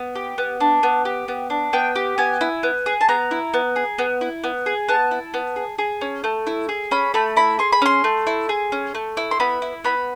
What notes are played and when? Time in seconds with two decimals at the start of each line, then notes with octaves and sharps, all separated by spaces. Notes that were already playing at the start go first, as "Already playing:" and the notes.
Already playing: B3
0.15 G4
0.38 B3
0.60 D4
0.83 B3
1.05 G4
1.28 B3
1.50 D4
1.73 B3 G5
1.96 G4
2.18 B3 G#5
2.41 E4
2.63 B3
2.86 G#4
3.01 A5
3.09 B3 A#5
3.31 E4
3.54 B3
3.76 G#4
3.98 B3
4.21 E4
4.44 B3
4.66 G#4
4.88 B3 A5
5.11 E4
5.34 B3
5.56 G#4
5.78 G#4
6.01 C#4
6.24 A3
6.47 E4
6.69 G#4
6.91 C#4 B5
7.14 A3 B5
7.36 E4 B5
7.59 G#4 C6
7.72 B5
7.82 C#4 C6
8.04 A3
8.27 E4
8.49 G#4
8.72 C#4
8.95 A3
9.17 E4
9.31 C6
9.40 B3 B5
9.62 E4
9.84 B3 B5